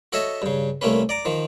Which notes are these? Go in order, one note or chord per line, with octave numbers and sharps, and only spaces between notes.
F#4 A4 C#5 D#5 E5
G2 C#3
C2 A3 A#3 C#4 B4
D5 A#5 D6
D#3 F3